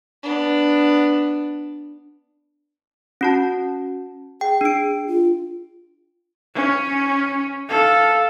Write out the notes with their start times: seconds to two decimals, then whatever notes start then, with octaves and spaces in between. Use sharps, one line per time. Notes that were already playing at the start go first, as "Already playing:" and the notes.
0.23 B3 D4
3.21 C#4 F#4 A5
4.41 G#4 G5
4.61 D4 D7
5.07 F4
6.55 C#4
7.69 A4 F5